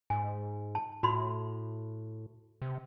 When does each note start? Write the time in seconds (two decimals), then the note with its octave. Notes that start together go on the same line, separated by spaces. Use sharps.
0.10 G#2 G#5
0.75 A5
1.03 A2 F#4 B5 C6
2.62 C3